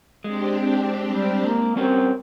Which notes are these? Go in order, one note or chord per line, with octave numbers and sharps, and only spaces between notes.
G#3 C4 D4 G4
G3
A#3
G3 C4 C#4 A#4